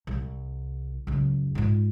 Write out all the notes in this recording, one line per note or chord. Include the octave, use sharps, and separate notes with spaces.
C2
C#2 F#2
G#2 F4